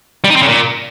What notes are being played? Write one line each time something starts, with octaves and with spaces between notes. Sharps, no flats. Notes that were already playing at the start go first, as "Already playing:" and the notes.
G3
D#4
C4
C#3
A#2